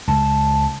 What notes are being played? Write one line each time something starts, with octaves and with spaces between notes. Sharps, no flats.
C#2 A5